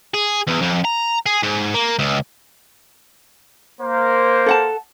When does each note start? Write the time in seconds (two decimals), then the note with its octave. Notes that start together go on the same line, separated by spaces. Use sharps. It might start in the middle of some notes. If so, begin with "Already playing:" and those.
0.14 G#4
0.48 E2
0.62 F2
0.85 A#5
1.26 G#4
1.43 G#2
1.74 A#3
1.99 C#2
3.81 A#3 C5
4.46 A4 F#5 A5